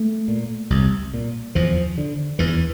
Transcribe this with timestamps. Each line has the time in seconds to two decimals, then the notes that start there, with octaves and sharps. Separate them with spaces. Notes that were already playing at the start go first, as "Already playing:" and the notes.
Already playing: A3
0.28 A#2
0.70 C2
1.14 A#2
1.55 E2 F3
1.98 D3
2.39 E2 E3